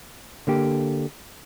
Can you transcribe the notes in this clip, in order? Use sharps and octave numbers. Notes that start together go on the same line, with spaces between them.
D3 A#3 G4